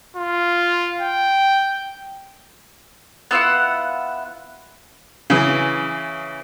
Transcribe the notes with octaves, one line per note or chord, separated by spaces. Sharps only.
F4
G5
B3 E4 F4 F#5
C#3 E3